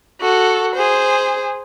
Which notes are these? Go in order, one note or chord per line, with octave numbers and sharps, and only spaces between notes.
F#4 A4
G#4 C5